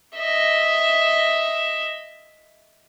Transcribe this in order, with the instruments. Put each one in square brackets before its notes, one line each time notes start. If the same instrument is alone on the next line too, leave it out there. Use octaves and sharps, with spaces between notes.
[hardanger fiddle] D#5 E5